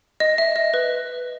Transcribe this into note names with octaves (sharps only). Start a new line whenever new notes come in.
D#5
E5
D#5
B4